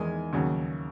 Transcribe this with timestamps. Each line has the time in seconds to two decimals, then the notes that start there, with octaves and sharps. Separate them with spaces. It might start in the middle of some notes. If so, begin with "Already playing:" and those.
Already playing: E2 D#3 G#3 G#5
0.33 D#2 C#3 F#3